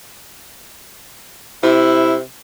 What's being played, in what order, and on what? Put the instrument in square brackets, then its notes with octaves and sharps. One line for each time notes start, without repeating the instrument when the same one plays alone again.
[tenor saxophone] C3 [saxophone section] E4